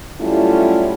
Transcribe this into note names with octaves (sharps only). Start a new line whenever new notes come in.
F#3 G3 A3 C#4 E4 F4